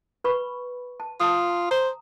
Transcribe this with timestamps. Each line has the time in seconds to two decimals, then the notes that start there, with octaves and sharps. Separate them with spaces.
0.24 B4 B5 C#6
1.00 A5
1.20 F4 A5 D#6
1.71 C5 A#5